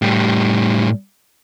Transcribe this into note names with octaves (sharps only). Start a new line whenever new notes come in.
A2 G3